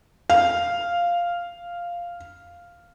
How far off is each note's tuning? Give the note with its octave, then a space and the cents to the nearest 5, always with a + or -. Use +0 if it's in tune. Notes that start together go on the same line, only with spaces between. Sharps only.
F5 -5